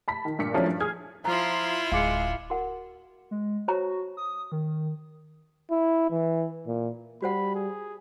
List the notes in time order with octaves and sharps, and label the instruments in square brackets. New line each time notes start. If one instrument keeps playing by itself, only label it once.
[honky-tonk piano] A5 B5 B6
D#3
G2 A#2 B6 C#7
F3 F#3 A3 C#4 D4 E4
G2
G#4 D#6 F6 G#6
[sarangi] F3 [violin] E4 F4 [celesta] A#5
[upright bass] D1 [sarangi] G#3 [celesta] F5 D6 C#7
[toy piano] F#4 A#4 F#5
[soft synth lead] G#3
[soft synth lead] F#4 [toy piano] C5 C#5 A#5
[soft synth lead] D#6
D#3
[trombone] E4
E3
A#2
[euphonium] G3 [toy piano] F#4 C5 F#5 [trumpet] B5
[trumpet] G#4